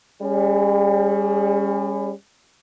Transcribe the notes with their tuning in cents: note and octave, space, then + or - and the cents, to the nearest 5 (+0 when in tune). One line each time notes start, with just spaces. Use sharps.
G3 +35 C#4 +0 G#4 +0